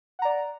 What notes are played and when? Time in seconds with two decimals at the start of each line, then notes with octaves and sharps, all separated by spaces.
0.19 F#5
0.22 A#5
0.25 D5